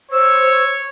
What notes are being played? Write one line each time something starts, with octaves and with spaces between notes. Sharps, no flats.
C5 C#5 E6